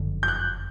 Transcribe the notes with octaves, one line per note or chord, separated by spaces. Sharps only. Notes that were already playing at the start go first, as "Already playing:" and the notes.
Already playing: F#1 F2 D3
G6
F#6